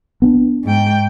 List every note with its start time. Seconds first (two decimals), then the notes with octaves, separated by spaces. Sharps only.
0.22 B3 C4 D4
0.64 G#2 G5